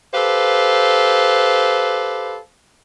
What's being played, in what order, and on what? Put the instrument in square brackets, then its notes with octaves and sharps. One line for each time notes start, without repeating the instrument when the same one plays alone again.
[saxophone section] G4 A4 B4 C5 F5